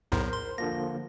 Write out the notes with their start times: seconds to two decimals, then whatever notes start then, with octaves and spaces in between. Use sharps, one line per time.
0.12 B1 E2 A2 A#4 C5
0.33 C6
0.58 D3 F3 A#3 A#6